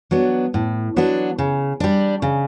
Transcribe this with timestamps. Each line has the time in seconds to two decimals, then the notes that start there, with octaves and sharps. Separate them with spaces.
0.11 F#3 B3 D4
0.54 A2
0.96 F#3 B3 D4
1.38 C#3
1.80 G3 D4
2.22 C#3